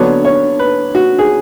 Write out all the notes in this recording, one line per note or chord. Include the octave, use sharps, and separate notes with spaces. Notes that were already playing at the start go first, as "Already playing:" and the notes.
Already playing: D3 F#3 B3 D4 C#5
C#5
B4
F#4
G#4